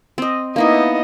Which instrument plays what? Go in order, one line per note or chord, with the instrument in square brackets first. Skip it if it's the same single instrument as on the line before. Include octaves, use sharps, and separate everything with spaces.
[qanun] C4 D#5
[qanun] A#3 D#4 E4 [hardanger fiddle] B3 D#5